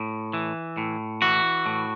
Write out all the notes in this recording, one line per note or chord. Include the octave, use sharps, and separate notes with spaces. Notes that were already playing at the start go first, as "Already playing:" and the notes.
Already playing: A2
E3
A2
E3 F#4
A2